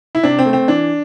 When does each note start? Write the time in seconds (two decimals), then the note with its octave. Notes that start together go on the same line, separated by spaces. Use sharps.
0.15 E4
0.23 C3 D4
0.39 C4
0.46 A3
0.53 C4
0.68 E3 D4